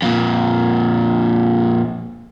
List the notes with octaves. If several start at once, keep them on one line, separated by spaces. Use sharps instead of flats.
F2 A#2